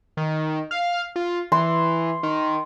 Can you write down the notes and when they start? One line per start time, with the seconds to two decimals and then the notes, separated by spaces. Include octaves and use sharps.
0.17 D#3
0.71 F5
1.16 F4
1.52 E3 C6
2.23 D#3